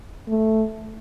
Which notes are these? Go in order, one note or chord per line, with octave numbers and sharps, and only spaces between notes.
A3